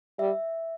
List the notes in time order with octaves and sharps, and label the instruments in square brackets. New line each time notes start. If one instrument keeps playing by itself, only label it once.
[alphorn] G3 [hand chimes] E5